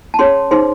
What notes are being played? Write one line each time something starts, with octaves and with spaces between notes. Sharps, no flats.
A5
C#4 G#4 C#5 C6
D#4 G#4 C5 C6